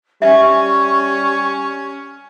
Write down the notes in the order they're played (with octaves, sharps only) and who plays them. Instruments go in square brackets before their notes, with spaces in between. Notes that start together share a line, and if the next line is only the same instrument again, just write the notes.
[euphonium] G3 [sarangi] C#4 [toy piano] E5 [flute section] C#6